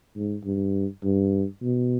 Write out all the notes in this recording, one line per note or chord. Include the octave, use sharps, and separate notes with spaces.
G#2
G2
G2
B2